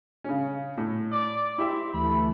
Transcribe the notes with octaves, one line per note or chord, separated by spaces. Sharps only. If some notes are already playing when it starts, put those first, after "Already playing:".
C#3 C#4
A2
D5
C4 E4 G4 E5
D2 E3 A3 B5